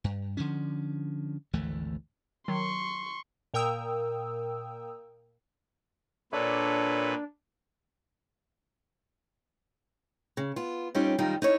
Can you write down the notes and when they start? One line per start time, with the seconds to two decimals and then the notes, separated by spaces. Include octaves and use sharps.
0.04 G2
0.37 D3 F3 C#4
1.53 G#1 D2 E3 A3
2.48 D#3 F#3 C6 C#6
3.54 A#2 A#4 G5 D#6 E6
6.33 A#2 D4 A4 B4 C#5
10.37 C#3
10.56 B3 F4
10.95 G3 C4 C#4 D#4 F4 G4
11.18 F#2 D#3 G3 D#4 F4 A#4
11.42 D#4 E4 C#5